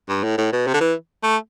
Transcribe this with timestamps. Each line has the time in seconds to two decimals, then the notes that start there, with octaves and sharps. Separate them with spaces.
0.09 G2
0.24 A2
0.38 A2
0.52 B2
0.67 C3
0.74 D3
0.81 E3
1.23 A3